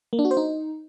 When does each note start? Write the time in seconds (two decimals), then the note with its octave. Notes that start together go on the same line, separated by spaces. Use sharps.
0.13 A#3
0.19 D4
0.25 F#4
0.31 C5
0.37 D#4